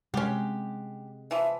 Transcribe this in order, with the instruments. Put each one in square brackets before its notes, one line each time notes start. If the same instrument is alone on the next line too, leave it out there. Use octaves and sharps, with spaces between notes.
[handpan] C3 F#5 [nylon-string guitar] G#3 [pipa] C#4 G4
[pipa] E3 F3 [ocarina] E5